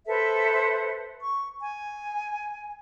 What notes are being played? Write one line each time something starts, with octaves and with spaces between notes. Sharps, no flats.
A4 B4 C5 E5
C#6
G#5